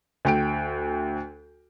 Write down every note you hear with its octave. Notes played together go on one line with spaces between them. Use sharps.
D2 G5 D7